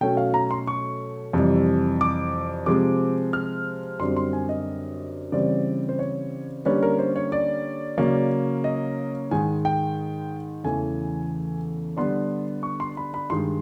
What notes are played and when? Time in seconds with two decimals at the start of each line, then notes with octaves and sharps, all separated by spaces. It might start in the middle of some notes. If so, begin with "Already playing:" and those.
0.01 B2 F#3 A3 C#4 G5
0.17 F5
0.34 A#5
0.51 C6
0.67 C#6
1.33 F2 C3 E3 G3
2.01 D6
2.66 C3 F3 G#3 C4 D6
3.33 F6
4.00 F#2 D3 G3 C4 C6
4.17 C6
4.33 G#5
4.49 D#5
5.32 C#3 E3 G3 C4 D5
5.89 C5
5.99 C#5
6.65 D3 G3 A#3 C#4 B4
6.83 A#4
6.99 C5
7.16 C#5
7.32 D5
7.98 C#3 F#3 A#3 C#4
8.64 D#5
9.31 G#2 D#3 G#3 G#5
9.65 G5
10.64 E2 C#3 E3 A3 G#5
11.97 D3 G3 B3 D4 C6
12.63 C#6
12.80 C6
12.97 B5
13.14 B5
13.30 G2 D#3 G#3 C6